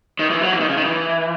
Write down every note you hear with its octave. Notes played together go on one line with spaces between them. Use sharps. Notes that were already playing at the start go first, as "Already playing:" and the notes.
D#3
E3
F#3
E3
D#3
C#3
D#3
E3